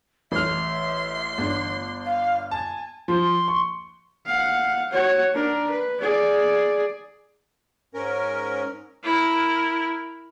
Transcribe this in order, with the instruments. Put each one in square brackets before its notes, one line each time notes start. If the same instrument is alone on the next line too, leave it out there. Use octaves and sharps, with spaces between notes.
[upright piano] A1 F6 [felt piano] A3 [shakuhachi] E5 [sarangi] C6
[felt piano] G1 D4
[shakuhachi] F5
[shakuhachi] G#5 [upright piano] A5
[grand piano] F3 [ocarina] C6
[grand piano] C#6
[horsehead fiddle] F5 F#5
F#4 C#5
D4 A#4
B4
G#4 D5
[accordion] G#2 C#4 A#4
[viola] E4 A#4